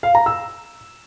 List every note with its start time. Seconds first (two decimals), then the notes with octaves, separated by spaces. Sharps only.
0.03 F5
0.15 A#5
0.26 E6